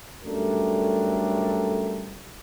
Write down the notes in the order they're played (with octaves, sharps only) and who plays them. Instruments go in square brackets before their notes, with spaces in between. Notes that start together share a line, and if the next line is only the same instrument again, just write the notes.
[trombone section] F#2 G3 A3 D4 A4 A#4